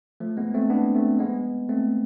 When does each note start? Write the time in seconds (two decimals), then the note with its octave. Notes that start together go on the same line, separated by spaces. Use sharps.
0.20 F3 A3
0.37 G#3 B3
0.54 A3 C4
0.70 B3 D4
0.95 A3 C4
1.19 G#3 B3
1.69 A3 C4